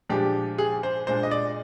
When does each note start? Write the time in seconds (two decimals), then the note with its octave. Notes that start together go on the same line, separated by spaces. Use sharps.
0.10 A#2 F3 G#3 D4 G4
0.58 G#4
0.83 C5
1.07 A#2 G#3 D4 C5
1.23 D#5
1.31 D5